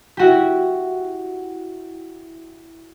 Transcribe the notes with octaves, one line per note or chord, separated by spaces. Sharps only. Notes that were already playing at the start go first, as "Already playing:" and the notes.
E4 F#4 G4